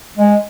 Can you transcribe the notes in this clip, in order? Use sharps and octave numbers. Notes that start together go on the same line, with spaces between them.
G#3